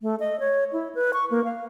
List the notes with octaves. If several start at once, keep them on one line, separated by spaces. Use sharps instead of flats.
A3
D#5
C#5
E4
B4
C#6
A#3
F5